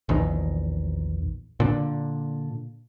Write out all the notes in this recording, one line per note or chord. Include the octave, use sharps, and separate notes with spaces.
A#1 E2 D#3
A#2 D3